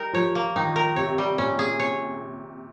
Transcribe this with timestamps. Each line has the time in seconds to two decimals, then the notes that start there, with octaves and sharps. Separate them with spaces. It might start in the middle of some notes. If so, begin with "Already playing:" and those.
Already playing: G3 D#4 A#4
0.13 F3 C#5
0.35 A#3
0.56 D#3 D#4
0.76 A#4
0.96 C3 C#5
1.18 G3
1.38 A#2 C#4
1.59 G#4
1.80 C#5